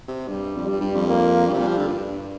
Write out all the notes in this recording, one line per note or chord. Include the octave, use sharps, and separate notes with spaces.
C3
G2 G3
F2
G2 G3
G2
F2
A#3
G2 G3
C3
A#2
F3
D3
G2